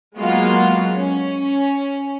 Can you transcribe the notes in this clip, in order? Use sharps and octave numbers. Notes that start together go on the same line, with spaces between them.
F#3 G#3 A#3 B3 F4 F#4
C#4